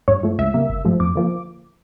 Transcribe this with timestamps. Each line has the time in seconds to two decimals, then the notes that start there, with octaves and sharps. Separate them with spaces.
0.08 G2 C#5
0.23 F3 A3
0.38 C#2 E5
0.54 C#3 G3 A#3
0.69 G1
0.85 G2 F3 A3
1.00 F2 D6
1.15 D3 F3 A#3